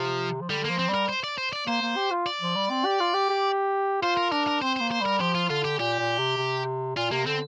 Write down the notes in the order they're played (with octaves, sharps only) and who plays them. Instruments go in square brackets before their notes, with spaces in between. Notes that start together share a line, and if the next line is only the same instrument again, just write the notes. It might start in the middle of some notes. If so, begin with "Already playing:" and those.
Already playing: [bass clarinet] C3 [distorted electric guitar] F3
[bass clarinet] F3
[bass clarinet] D3 [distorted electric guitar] G3
[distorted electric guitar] A#3
[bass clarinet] F3
[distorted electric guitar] C4
[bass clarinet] G3
[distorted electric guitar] A#4
C5
D5
C5
D5
[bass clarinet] A#3 [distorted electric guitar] C5
[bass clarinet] A#3
G4
F4
[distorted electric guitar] D5
[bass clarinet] F3
G3
C4
G4
F4
G4
G4
[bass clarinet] F4 [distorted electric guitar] C5
[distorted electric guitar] A#4
[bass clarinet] D4 [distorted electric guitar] A#4
[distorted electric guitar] A#4
[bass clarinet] C4 [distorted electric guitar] C5
[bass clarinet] A#3 [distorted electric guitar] C5
[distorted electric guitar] C5
[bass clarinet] G3 [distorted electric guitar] A#4
[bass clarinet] F3 [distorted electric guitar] G4
[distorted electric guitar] F4
[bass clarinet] D3 [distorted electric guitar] F4
[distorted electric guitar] G4
[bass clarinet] A#2 [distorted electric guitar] G4
[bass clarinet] A#2
C3
C3
[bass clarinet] A#2 [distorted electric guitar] F4
[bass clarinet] C3 [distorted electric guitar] A#3
[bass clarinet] D3 [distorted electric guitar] C4